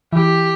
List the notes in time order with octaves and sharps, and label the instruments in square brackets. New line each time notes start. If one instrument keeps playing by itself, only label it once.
[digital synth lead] E3 [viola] G4